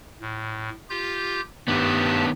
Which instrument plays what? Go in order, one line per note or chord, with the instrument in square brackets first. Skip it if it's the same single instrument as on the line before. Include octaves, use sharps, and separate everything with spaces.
[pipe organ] A2
F4 G4 G6
[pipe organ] G2 G4 A5 [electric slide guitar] D#3 B3